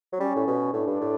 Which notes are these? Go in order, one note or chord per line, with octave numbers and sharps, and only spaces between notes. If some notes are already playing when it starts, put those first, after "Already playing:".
F#3
G3 C#4
A2
B2
A2 D4
G2
A2